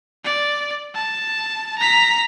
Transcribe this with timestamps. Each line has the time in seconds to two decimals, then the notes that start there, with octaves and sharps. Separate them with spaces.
0.24 D5
0.95 A5
1.78 A#5 B6